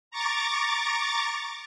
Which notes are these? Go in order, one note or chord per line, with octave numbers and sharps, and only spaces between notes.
A#5 C#6 D6 A6